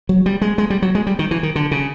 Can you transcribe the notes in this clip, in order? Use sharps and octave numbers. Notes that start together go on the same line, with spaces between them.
F#3
G3
G#3
G#3
G3
F#3
G#3
G3
D#3
E3
D#3
D3
C#3